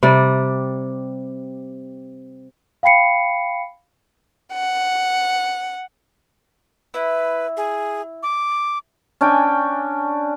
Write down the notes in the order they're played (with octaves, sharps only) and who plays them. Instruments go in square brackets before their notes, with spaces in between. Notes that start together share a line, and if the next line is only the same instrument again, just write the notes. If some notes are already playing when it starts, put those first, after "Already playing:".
[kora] C3 G3 D5
[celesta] F5 G5 B5 C7 C#7
[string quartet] F#5
[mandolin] E4 [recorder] B4
[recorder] G#4
D6
[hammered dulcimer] C#4 D4 G5 G#5